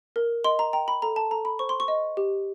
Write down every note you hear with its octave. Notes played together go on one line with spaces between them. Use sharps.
A#4
D#5 C6
A#5
G5 A#5
B5
A4 A#5
A5
A4 A#5
B5
C5 C#6
C6
C#6
D#5
G4